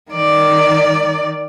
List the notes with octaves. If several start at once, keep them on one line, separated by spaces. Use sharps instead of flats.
D#3 D5